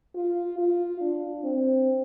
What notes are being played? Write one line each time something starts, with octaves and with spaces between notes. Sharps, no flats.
F4
F4
D4
C4